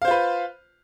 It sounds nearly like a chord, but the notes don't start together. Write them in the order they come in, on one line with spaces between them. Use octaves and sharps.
F5 C5 F4 B4